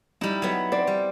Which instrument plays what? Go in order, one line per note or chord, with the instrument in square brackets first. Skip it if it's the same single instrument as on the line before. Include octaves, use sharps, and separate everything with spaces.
[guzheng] G3 E4 [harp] D#4
[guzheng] F#3 B3
[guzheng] C4 [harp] D5
[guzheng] G3